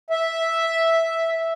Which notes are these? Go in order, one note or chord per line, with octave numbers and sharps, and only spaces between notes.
E5